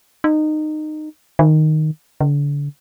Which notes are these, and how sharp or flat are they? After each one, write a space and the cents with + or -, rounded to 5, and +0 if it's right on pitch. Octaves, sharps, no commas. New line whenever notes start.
D#4 -20
D#3 -5
D3 -35